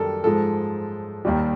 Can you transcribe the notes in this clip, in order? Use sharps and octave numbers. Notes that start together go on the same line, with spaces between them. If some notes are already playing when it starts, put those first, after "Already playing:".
Already playing: F#2 D#3 G3 A4 A#4
G#2 F3 G#3 A4
D#2 D#3 G3